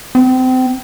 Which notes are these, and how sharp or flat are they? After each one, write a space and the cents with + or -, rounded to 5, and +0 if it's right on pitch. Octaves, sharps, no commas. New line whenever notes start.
C4 -30